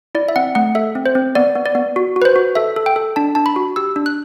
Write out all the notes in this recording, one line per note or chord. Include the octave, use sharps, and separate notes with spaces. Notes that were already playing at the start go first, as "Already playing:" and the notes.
E4 D5
E5
C4 F#5
A3 F#5
A4 E5
C4
C5
C4
B3 D5
B3
D5
B3
F#4
F#4
B4
C5
F#4
A4 E5
A4
G5
A4
D4 A5
D4 A5
B5
F#4
G4 E6
D4
F#6